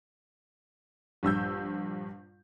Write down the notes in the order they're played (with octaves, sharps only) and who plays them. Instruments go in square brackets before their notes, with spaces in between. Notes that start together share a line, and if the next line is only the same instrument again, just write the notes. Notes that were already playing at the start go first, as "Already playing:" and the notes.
[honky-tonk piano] A#1 G2 E6 G6